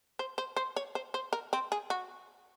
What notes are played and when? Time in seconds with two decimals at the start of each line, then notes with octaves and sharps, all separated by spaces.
0.19 C5
0.38 C5
0.56 C5
0.76 C#5
0.95 C5
1.14 C5
1.33 A#4
1.53 C4
1.72 G#4
1.90 F#4